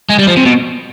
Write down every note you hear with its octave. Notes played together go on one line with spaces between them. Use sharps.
G#3
G3
F3
C3
B2